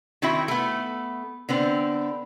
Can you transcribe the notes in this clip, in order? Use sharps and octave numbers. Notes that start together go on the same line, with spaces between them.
D#3 C4 E4 F#4 E5
A3 B3
D3 B3 C4